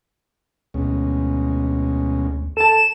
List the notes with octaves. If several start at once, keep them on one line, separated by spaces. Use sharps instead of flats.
D2 B2 G#3 C#4
A4 A5 E7